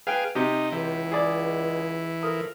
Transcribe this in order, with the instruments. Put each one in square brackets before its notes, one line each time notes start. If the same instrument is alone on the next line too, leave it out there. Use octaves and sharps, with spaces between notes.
[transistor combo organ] G#4 F5 [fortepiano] B4 G5
[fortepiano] C3 G4 [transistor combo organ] D#4
[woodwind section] C#2 [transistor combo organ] E3
[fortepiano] G#4 D5
[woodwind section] F3 A4 A#4 [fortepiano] D#6